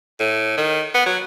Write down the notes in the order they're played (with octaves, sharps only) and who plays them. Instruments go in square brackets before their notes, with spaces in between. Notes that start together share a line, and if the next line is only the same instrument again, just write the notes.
[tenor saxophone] A2
D#3
B3
F#3